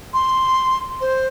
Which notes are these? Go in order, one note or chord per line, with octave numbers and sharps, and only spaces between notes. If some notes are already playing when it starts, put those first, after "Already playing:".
C6
C5